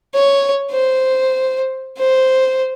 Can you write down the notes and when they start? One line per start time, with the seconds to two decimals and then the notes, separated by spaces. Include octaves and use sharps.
0.15 C#5
0.71 C5
1.98 C5